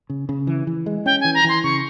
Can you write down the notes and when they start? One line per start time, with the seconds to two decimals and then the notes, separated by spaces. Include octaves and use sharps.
0.10 C#3
0.29 C#3
0.47 E3
0.67 E3
0.86 G#3
1.06 C#4 G5
1.21 E3 G#5
1.35 A#5
1.44 E3 C6
1.63 C#3 C#6